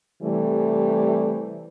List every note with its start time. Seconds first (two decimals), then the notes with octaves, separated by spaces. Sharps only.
0.23 C3 E3 G3 A3